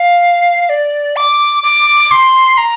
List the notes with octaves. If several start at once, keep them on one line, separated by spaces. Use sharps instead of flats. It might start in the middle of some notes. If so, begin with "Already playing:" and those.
Already playing: F5
D5
D6
D6
C6
A#5